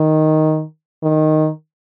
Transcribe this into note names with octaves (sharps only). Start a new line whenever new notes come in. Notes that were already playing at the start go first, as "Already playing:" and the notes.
Already playing: D#3
D#3